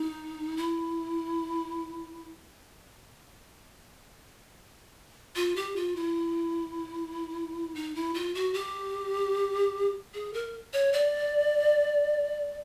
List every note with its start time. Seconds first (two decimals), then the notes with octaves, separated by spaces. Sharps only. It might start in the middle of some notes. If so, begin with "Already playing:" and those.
Already playing: D#4
0.57 E4
5.36 F4
5.56 G4
5.76 F4
5.96 E4
7.75 D#4
7.95 E4
8.14 F4
8.35 F#4
8.54 G4
10.14 G#4
10.33 A#4
10.73 C#5
10.93 D5